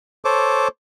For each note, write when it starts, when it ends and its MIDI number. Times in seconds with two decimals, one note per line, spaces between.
0.25 0.68 69
0.25 0.68 72
0.25 0.68 73
0.25 0.68 86